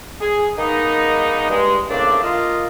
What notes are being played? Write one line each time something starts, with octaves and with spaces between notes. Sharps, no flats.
G#4
D#3 G#3 A#3 B3 D#4
G2 G#3
A2 C#3 A#3 C4 D4
A#3 F4 D#5